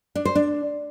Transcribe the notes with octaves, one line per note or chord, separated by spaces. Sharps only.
D4
C5
D4